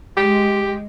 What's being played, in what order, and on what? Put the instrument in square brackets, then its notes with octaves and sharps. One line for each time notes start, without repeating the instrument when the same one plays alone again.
[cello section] G#3 [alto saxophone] G4